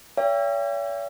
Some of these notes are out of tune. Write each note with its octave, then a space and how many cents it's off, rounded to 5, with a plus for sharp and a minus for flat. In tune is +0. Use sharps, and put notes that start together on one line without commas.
C#5 +45 E5 +40 G5 +25